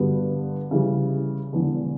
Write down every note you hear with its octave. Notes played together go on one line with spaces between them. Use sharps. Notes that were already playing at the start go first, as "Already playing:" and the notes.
Already playing: G2 D3 G3 B3 F#4
C#3 E3 G3
E1 E2 D3